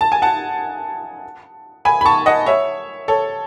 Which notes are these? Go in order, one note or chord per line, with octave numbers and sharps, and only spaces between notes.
A5
G#5
F#5 A5
G#5 B5
B5
A5 C#6
D#5 F#5
C#5 E5
A4 C#5